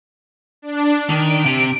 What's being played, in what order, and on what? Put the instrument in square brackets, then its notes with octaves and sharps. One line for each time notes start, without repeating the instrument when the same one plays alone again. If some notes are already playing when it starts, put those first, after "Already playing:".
[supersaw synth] D4
[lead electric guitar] D#3 [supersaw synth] D7
[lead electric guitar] C3